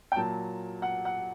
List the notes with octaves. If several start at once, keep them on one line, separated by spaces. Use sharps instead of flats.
G5
A#2 F#3 A5
F#5
F#5